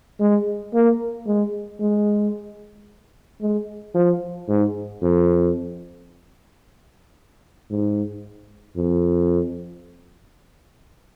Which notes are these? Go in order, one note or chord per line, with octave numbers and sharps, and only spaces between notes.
G#3
A#3
G#3
G#3
G#3
F3
G#2
F2
G#2
F2